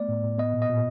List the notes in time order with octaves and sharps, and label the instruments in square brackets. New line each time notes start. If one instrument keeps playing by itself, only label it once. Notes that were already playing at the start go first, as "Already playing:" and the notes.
Already playing: [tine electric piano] A3 B3 D5
A2
A2
B3 D#5
A#2
D#5
A#2